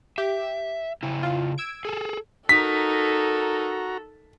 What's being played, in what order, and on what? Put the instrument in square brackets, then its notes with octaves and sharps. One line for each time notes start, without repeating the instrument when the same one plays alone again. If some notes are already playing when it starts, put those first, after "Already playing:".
[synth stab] G4 [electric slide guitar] E5
[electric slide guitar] C#3 E4
[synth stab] F4
E6 G#6 D7
[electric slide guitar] G#4 A4
[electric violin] D#4 A#4 [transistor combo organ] F#4 A#5 [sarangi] A4 [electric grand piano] B6